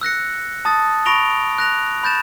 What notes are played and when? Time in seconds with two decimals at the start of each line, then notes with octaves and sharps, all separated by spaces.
0.01 E6 F#6 A#6 C#7
0.65 A5 D#6 A6
1.06 B5 C#6 A#6 D7 F7 G7
1.58 F#6 A#6 F7
2.03 B5 G6 A6 E7